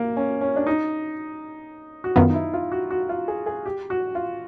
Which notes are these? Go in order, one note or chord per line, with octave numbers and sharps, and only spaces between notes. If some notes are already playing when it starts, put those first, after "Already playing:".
Already playing: A#3
C#4
C#4
D4
D#4
F#4
F#2 D#3 F#3 B3 F4
D#4
E4
F4
F#4
F#4
F4
G#4
G#4
G4
F#4
F4